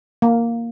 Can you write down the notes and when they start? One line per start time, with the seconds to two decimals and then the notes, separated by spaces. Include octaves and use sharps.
0.22 A#3